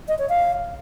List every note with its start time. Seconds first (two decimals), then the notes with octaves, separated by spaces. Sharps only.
0.08 D#5
0.19 C#5
0.29 F5